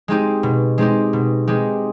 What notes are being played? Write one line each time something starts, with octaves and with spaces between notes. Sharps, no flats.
G#3 C4 D#4 G4
B2
G#3 C4 D#4 G4
B2
G#3 C4 D#4 G4